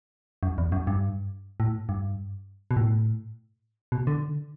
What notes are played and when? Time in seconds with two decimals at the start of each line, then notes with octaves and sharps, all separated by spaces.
0.43 F#2
0.58 E2
0.72 F#2
0.87 G2
1.60 A2
1.89 G2
2.71 B2
2.77 A2
3.92 B2
4.07 D3